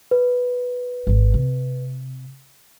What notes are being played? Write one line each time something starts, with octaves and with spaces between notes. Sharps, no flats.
B4
G#1 D#3
C3